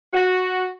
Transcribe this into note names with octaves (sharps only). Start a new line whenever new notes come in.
F#4